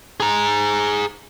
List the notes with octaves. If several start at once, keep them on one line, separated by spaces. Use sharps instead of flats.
G#4 A#5